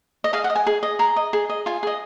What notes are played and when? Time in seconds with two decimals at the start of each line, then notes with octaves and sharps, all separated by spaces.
0.24 D#5
0.33 G#4 F5
0.44 F#5
0.50 D#5
0.55 G#5
0.67 G#4
0.83 D#5
0.99 G#4 A#5
1.16 D#5
1.33 G#4
1.50 D#5
1.66 F4 G#5
1.83 G#4 D#5